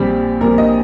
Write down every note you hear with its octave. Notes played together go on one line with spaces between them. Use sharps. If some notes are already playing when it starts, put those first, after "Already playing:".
Already playing: A#1 A#2 G3 C4 G4
A#1 A#2 G3 C4 A#4
D#5